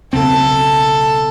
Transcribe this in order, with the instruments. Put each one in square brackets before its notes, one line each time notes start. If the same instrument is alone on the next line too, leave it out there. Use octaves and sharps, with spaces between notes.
[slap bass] B1 C#3 C4 [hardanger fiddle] A4